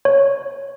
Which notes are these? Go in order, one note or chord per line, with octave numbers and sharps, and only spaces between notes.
C#5